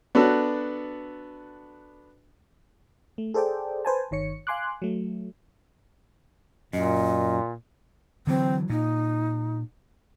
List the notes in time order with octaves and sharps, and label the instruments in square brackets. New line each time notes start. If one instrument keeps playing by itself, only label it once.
[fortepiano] B3 D4 F#4 A4
[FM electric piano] A3
G#4 A4 C5 D5 G5
B4 C5 G#5 A5
G1 D#3 C#5 C#7
F5 G#5 C6 D6 F#6
F#3 A3
[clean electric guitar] F#2 [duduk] A#2 [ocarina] D#5
[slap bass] D3 E3 F#3 [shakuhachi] C4
[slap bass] A#2 [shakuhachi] D#4